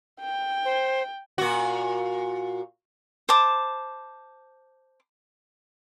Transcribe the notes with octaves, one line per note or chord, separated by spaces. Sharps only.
G5
C5
A#2 F#4
C5 A5 D6